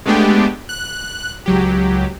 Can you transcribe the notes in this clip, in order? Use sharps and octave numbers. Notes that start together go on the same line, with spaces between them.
G#3 A3 B3 D4 G4
F#6
C#2 F#3 G4